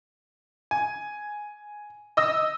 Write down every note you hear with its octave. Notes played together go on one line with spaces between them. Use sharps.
G#5
D#5 E6 A#6